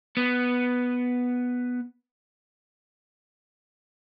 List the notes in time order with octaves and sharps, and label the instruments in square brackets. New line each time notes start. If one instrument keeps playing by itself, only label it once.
[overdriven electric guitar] B3